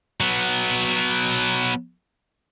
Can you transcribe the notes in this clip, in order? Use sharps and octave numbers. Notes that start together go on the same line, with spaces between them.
F#3 B3